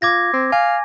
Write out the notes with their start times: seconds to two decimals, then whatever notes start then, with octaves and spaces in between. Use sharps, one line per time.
0.02 F4 D6 G#6 A#6
0.33 C4
0.52 F5 G#5